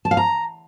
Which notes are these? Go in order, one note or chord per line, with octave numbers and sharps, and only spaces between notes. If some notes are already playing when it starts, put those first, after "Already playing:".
A5
F5
A#5